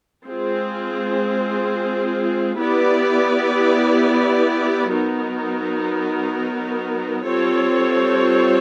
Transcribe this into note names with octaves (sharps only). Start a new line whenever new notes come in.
G#3 C4 F4 G#4
B3 E4 G4 B4 D5
F#3 B3 D#4 F#4 A#4
G3 C4 F4 A4 C#5